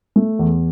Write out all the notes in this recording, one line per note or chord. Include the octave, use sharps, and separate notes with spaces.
A3
E2